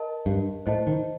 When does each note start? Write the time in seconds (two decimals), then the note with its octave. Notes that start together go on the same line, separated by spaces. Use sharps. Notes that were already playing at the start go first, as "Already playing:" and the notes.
Already playing: A#4 D#5 A5
0.26 G2
0.66 A2 C5 D#5 A5
0.87 D#3